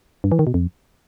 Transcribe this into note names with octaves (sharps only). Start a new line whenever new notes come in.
G2
E3
D#3
B2
F2